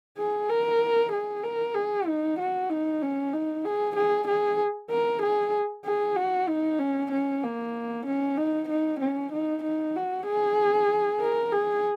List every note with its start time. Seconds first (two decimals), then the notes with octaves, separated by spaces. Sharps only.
0.18 G#4
0.49 A#4
1.12 G#4
1.43 A#4
1.75 G#4
2.07 D#4
2.39 F#4
2.69 D#4
3.02 C#4
3.33 D#4
3.64 G#4
3.96 G#4
4.27 G#4
4.90 A#4
5.22 G#4
5.85 G#4
6.16 F#4
6.48 D#4
6.79 C#4
7.12 C#4
7.43 A#3
8.06 C#4
8.37 D#4
8.69 D#4
9.00 C#4
9.32 D#4
9.63 D#4
9.95 F#4
10.26 G#4
11.20 A#4
11.52 G#4